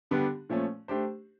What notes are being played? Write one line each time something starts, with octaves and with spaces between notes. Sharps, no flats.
D3 G3 B3 D4 G4
A#2 F3 A3 C#4
A3 D4 G4 C5